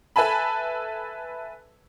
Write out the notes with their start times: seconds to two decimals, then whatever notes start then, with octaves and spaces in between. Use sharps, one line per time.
0.16 A4 B4 E5 G#5 A5 B5